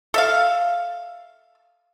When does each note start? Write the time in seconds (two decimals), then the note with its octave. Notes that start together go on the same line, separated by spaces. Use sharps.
0.14 A4 E5 F5